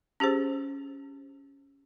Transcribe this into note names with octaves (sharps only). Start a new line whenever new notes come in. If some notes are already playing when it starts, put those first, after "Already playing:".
C#4 G4 G#4 C5